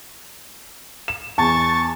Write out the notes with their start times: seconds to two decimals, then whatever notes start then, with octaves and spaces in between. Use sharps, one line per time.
1.08 E7
1.38 E2 A5 C#6 A6